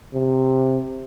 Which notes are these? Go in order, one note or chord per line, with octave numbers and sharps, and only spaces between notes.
C3